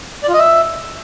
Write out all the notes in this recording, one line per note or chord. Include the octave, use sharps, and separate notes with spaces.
D5
F4
D#5
E5